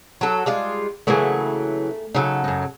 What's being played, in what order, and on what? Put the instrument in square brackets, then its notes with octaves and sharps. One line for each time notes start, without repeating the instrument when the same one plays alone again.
[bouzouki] F#3 A4
G3 G#3 F4
[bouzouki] C#3 E3 F#3 [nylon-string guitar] A3 A#3 G#4
[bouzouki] C#3 F#3 A4 [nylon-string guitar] D#4
[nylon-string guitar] F#2 D#4